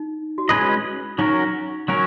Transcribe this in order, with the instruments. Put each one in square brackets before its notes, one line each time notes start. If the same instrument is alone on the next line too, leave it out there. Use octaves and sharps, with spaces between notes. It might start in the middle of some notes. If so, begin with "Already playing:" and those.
Already playing: [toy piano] D#4
F#4
[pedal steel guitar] G#3 C#4 G#4 B4 D#5 [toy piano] E4
[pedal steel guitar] F#3 C#4 F#4 A#4 [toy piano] D#4
[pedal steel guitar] F#3 C#4 F#4 A#4